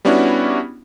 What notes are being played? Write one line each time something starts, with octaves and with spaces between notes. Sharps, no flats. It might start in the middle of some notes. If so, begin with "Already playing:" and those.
G3 B3 C#4 D4 E4 F#4